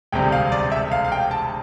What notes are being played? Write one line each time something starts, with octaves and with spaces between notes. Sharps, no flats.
E1 D2 C3 G3 G5
F5
D5
E5
F5
F5
G5
A5